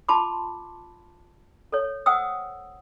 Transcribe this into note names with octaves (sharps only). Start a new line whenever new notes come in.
F4 A5 B5 C6 D6
A4 C#5
C5 F#5 G5 D#6 E6